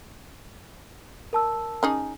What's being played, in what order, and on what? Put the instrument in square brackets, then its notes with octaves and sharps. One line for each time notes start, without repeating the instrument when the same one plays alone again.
[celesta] A#4 A5 E6
[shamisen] C#4 D#4 G#4